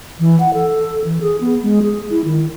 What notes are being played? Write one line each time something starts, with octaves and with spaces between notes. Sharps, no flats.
E3
F#5
A4
E3
G#4
B3
G#3
G#4
E4
D#3